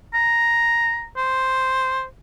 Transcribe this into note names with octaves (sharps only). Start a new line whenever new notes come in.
A#5
C5